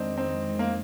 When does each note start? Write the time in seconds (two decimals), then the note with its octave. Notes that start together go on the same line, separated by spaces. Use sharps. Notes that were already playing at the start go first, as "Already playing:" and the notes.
Already playing: F2 D#3 G#3 C4 D4 D#4
0.17 C4 D#4
0.59 A#3